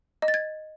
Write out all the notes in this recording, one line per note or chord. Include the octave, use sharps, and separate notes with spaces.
D#5
A6
G#6